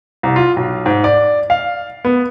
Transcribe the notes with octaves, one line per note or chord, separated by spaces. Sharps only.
C2
F4
B1
G#2
D5
F5
B3